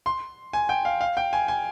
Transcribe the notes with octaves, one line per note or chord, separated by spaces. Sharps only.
C6
G#5
G5
F5
F5
G5
G#5
G#5